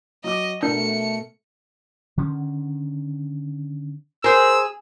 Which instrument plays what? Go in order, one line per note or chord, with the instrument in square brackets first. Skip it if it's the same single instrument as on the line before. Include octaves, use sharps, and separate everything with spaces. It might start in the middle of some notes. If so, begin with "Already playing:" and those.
[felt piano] F#3 D6 [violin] D#5
[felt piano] B2 A#4 [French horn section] A3 [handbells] D4 [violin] C#7
[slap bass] D3 D#3 C#4
[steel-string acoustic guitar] G#4 [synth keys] A#4 C5 [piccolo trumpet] E6